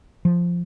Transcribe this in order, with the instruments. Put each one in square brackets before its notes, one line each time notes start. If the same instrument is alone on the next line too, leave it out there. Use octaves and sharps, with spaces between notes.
[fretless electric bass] F3